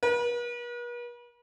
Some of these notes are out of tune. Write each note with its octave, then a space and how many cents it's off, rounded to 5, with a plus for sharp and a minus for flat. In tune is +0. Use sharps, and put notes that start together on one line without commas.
B4 -45